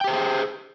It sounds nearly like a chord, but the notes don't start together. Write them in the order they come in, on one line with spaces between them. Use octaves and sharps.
G5 G4 C5 G#4